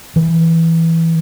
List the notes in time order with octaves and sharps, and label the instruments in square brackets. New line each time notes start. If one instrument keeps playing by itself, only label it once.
[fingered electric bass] E3